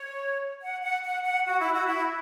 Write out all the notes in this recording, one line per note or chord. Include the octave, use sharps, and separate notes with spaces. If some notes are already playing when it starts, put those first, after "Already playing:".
Already playing: C#5
F#5
F#5
F#5
F#5
F#4
E4
F#4
E4